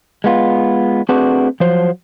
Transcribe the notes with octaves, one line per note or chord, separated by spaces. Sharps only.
G#3 B3 F4
A3 C4 D4 F#4 G#4 B4
F3 F#3 C5